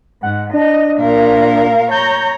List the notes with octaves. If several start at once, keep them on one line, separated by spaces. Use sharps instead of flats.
G#2 F#5
D4 D#5
A#2 A#4 F5
C#5 A#5 G6